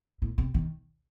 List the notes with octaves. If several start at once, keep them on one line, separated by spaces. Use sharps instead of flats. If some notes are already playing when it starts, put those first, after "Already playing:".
A2
C3
D#3